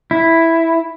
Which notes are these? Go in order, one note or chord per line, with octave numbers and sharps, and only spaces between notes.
E4